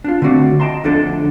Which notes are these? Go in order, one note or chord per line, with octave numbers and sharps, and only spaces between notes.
D4 F4
D3 A3 C4 F#4 D5
D#5 G5 A5 A#5 C6
D2 D3 F3 D4 A4